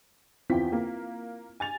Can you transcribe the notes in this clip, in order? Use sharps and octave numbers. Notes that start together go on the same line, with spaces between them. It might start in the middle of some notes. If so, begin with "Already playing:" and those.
E2 C4 E4 F4 G5 B6
A#3
G#5 A6 F7